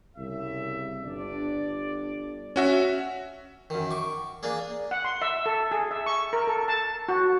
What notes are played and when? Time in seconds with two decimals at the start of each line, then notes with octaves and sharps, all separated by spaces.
0.17 C2 C#3 E5
1.04 G1 D4 D5
2.56 C#4 F#4 E5
3.70 F#2 D#3
3.91 C#6 D6
4.43 A#3 D4 G#4
4.91 F#5
5.05 C6
5.22 E5
5.46 A4
5.71 G#4
5.91 E5
6.06 C#6
6.33 A#4
6.47 A4
6.68 A5
7.09 F#4